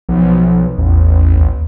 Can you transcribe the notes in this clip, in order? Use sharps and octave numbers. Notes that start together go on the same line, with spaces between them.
B1 F3
A1 E2
D#2